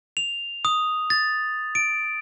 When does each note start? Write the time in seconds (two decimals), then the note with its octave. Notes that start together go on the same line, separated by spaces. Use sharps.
0.17 F7
0.65 D#6
1.10 A6
1.75 D7